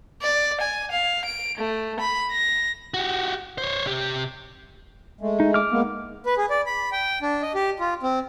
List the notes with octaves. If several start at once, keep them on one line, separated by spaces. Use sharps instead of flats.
D5
G#5
F5
D7
A3
B5
A#6
F#4 G4
C5 C#5
C3 G4
G#3 A3
D#4
D6 F6
G#3 A#3 B3
B4
G#4
D5
B5
G5
D4
D#5
G4
F4
C4